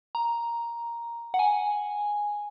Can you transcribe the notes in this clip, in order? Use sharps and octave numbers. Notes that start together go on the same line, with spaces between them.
A#5
F#5
G#5